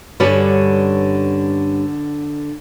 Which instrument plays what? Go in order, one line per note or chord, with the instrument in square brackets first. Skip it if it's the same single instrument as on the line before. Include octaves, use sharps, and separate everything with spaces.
[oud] G2 C#4 D5 [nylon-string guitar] D3 F#4 B4